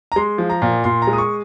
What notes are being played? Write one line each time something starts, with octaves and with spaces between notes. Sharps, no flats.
A#5
G#3 C6
F3
A#5
A#2
A#2 C6
A#5
G#3
D#6
C#6